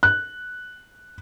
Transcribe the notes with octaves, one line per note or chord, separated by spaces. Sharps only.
F#6